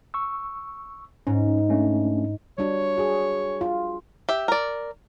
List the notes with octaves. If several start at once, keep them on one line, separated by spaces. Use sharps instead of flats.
C#6 E6
G#2 C#4
A3 C#4 D4
G3 D4 F#4 C#5
F#4 G#4
F4
G4 E5
A#4 D5